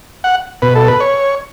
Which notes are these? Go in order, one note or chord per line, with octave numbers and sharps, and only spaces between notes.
F#5
B2 B4
A4
B4
C#5